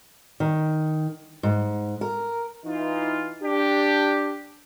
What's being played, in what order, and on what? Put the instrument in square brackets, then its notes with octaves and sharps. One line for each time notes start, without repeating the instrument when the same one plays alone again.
[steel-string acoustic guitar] D#3
G#2
A#4
[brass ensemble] E3 D#4 F4
D4 G4